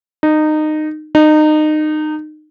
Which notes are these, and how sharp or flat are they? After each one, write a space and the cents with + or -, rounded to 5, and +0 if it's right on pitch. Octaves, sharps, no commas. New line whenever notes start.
D#4 -20
D#4 -25